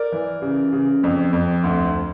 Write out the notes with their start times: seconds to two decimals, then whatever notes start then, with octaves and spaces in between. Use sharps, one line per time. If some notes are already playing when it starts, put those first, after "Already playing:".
Already playing: A#4 D5
0.12 E3
0.42 C#3
0.73 C#3
1.03 F2
1.33 F2
1.64 D2